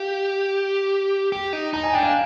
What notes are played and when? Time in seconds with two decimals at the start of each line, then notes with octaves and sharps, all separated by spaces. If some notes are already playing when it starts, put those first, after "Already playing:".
Already playing: G4 F5
1.32 G4
1.53 D#4
1.73 D#4 A#5
1.84 G#5
1.93 D4 G5
2.03 F5 G#5